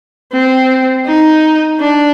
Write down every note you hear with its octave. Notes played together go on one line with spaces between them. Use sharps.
C4
D#4
D4